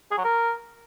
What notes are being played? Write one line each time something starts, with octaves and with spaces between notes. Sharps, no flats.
G#4
F#3
A#4